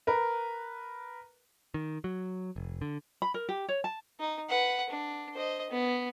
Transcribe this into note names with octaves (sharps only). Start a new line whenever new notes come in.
A#4 B4
D#3
F#3
F1
D3
B5
A#4
G4
C#5
A5
D#4
B4 F#5
D4
C5 D#5
B3